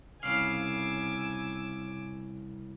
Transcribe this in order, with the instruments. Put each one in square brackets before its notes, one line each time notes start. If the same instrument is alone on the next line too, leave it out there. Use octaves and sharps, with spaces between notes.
[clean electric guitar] C2 C#3 F5 [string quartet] G#5 D6 E6